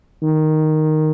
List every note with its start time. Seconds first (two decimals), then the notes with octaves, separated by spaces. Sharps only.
0.23 D#3